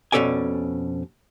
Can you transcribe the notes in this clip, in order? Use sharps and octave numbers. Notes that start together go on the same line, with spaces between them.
F2 B2 C#4 A4 D5 G#5